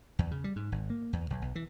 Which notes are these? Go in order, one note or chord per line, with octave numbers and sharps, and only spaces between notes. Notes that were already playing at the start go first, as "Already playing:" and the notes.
E2
C#3
G3
G#2
G#1
A#3
E2
B1
B1
E3